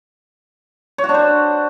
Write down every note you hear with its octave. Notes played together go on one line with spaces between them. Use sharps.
C#5
F#4
D4
C5